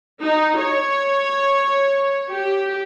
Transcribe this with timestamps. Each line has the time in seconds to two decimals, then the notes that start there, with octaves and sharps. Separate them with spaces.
0.22 D#4
0.58 C#5
2.30 G4